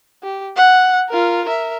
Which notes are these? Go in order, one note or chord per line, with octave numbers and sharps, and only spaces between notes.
G4
F#5
F4 A#4
A#4 E5